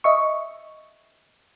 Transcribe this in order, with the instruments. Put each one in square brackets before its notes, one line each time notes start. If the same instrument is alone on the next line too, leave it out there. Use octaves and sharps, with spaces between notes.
[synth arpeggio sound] D#5 E5 C#6